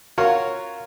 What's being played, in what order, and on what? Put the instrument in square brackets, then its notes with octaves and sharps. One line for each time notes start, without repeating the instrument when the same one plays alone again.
[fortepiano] C#4 F4 F#4 A#4 C#5